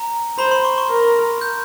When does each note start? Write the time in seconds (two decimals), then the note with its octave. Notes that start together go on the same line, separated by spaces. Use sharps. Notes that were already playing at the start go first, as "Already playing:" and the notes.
Already playing: A#5
0.38 C5 B5
0.51 C6
0.65 C#6
0.78 C#6
0.90 A#4
1.41 G6